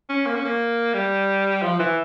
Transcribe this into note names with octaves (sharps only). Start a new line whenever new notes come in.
C#4
A#3
C#4
A#3
G3
F3
E3